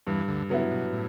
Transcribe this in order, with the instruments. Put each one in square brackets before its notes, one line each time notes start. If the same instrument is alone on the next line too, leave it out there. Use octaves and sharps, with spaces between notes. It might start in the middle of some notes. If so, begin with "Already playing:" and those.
[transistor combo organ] E2 E3 [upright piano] G2
[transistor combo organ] D2 D3
[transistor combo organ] C#3 [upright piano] F#3 B3 E4
[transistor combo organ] B2
A2